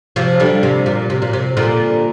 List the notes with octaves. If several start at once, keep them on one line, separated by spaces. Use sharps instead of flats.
C3 F3
D3 G3
C3
A#2
C3
A#2
C3
A#2 D3